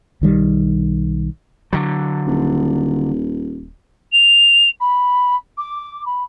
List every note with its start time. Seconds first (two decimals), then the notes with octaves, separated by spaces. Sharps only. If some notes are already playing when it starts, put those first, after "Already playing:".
0.21 B1 D#3 G3
1.73 D3 F#3
2.27 D#1
4.12 F7
4.80 B5
5.58 D6
6.06 B5